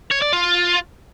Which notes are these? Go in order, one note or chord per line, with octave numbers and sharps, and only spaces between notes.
C#5
D5
F4